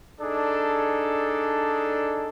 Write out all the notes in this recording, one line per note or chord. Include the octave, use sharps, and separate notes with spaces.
D4 D#4 G#4 A4 D5